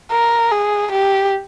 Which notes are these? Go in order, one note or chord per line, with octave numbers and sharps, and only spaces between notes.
A#4
G#4
G4